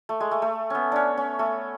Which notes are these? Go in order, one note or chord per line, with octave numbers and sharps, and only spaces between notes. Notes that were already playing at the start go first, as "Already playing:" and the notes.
A3
G#3
A3
A3
B3 C#4
C#4 D4
C#4
A3